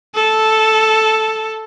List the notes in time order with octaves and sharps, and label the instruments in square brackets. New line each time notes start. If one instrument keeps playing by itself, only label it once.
[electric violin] A4